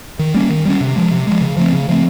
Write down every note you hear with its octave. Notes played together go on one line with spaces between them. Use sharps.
D#3
G3 A#3 C#4
D#3
G3 A#3 C#4
C3
F3 G#3
C3
F3 G#3
C#3
F3 A3 C4
C#3
F3 A3 C4